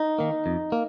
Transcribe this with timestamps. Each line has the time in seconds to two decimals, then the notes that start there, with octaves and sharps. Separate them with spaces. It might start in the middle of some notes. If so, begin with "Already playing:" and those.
Already playing: D#4
0.18 D#3 A#3
0.46 F2
0.72 A#3